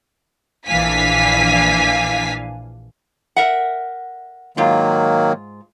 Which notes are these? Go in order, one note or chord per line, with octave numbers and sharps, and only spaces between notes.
A#1 E3 D4 F5 G#5 B6
A#4 E5 F#5
G#2 D#3 F#3 A#3 F4